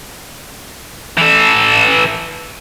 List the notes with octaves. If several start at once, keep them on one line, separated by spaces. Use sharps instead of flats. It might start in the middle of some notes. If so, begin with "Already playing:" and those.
E3 A4